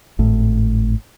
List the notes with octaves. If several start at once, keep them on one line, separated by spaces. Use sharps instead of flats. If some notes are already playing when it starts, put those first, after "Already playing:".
G#1 A2